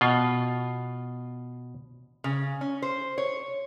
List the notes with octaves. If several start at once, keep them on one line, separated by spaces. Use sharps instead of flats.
B2 F4
C#3
C#4
C5
C#5